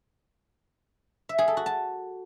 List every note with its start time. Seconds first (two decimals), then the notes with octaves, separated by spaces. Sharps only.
1.29 E5
1.38 G#4
1.48 A4
1.57 F#4
1.66 A5